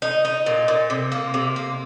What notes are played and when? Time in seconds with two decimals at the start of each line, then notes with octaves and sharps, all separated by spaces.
0.02 D#4
0.25 D#4
0.46 A#2
0.68 A#2
0.90 C3
1.12 A#3
1.34 C3
1.56 A#3